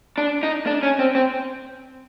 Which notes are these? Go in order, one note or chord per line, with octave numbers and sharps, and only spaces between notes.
D4
D#4
D4
C#4
C4
C4